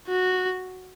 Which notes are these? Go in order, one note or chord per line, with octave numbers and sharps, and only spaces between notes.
F#4